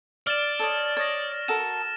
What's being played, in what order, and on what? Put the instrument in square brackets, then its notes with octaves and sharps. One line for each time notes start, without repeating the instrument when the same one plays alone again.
[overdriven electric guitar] D5 [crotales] F6 A6 E7
[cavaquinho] A4 C#5 D#5
[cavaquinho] C#5 D#5 [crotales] A6 A#6
[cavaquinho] F#4 A4 A#4 [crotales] E7